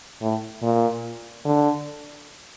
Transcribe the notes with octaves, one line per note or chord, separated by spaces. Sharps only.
A2
A#2
D3